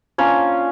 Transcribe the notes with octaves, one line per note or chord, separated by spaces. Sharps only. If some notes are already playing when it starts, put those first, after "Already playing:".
A#3 C#4 D4 F4 C#5